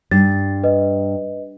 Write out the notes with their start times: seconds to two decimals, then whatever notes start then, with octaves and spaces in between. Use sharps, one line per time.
0.11 G2 A6
0.64 B4 D#5